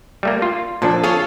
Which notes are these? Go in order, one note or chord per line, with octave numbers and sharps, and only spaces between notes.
G3 A3 A#3
F4
A#2 F3 D4 A4
F4 G#4 A4 C#5 F5